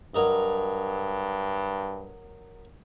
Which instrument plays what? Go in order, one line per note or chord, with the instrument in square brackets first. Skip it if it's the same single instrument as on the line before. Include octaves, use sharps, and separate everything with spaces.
[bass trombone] G2 [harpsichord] F#3 A#4 D#5